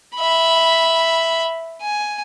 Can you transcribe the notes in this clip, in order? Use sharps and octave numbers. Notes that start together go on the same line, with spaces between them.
E5 B5
G#5